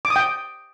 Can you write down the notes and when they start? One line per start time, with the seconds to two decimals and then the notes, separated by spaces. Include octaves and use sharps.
0.05 D6
0.10 D#6
0.16 G5